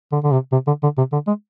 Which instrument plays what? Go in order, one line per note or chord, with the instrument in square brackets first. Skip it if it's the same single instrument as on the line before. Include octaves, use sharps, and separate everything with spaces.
[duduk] D3
D3
C3
C3
D3
D3
C3
D3
G#3